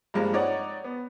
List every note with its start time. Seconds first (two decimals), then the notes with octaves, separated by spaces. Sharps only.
0.14 G2 F3 G3 G#3 A#3
0.33 C4 D#4 C#5 D5 F#5
0.84 B3